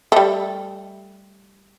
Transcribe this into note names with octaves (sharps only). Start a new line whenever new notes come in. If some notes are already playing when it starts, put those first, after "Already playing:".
G3 A3